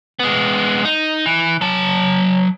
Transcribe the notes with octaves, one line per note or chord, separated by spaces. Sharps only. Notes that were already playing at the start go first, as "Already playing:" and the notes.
G#3 B3
D#4
E3
F#3 A5